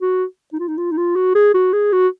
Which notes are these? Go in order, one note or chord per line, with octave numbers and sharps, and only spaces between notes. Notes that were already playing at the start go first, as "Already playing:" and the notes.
F#4
D#4
F4
D#4
F4
D#4
F4
F#4
G#4
F#4
G#4
F#4